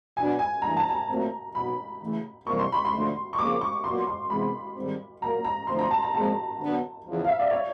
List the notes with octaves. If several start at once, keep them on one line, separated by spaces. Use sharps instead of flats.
B2 F#3 B3 D4 G#5
G#5
G2 E3 A3 A#5
A5
A#5
A#2 F#3 A3 C4
B2 F#3 B3 D#4 B5
C#3 E3 A3
F2 C3 E3 G3 A#3 C#6
C6
B5
C6
D2 D3 F3 A3
C#6
F2 C#3 F3 A#3 D6
C#6
A#2 F#3 B3 C6
C6
C3 E3 G#3 B3 B5
G#2 D#3 G3 C4
A#2 F#3 A#3 A#5
A#5
D3 F3 A3 C4 C6
A#5
A5
A#5
A#2 F3 G#3 C4 A5
D3 F#3 B3 D4
E2 C#3 F3
F5
E5
D5
C#5